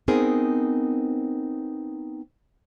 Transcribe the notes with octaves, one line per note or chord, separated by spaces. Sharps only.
B3 C4 D#4 G#4 A#4 C5